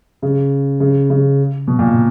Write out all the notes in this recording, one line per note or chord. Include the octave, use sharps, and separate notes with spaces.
C#3
C#3
C#3
B2
A#2